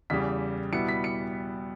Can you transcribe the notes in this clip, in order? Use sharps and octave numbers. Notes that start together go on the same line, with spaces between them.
E2 C#3 G3 B6
B2 G3 B3 E4 C#7
B6
C#7